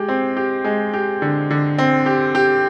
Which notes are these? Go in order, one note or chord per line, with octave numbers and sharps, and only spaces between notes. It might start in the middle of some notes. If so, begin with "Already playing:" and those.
Already playing: G#3 G4
C4
G4
G#3
G4
D3
D3
C4
G4
G4